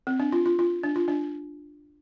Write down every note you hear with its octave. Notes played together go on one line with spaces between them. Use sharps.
C4
D4
F4
F4
F4
D4
F4
D4